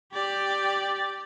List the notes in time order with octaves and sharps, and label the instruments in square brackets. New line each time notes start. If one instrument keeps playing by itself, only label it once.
[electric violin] G4 D5